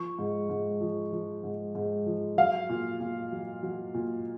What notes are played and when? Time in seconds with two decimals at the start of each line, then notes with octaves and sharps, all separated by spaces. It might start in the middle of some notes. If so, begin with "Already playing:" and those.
Already playing: F3 C#6
0.18 G#2
0.50 G#2
0.80 F3
1.12 F3
1.43 G#2
1.75 G#2
2.06 F3
2.37 F#3 F5
2.69 A#2
3.00 A#2
3.32 F#3
3.63 F#3
3.94 A#2